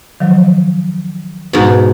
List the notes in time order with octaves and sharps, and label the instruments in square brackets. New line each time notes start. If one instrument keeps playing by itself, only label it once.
[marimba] D#3 F3 F#3
[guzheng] G#2 B2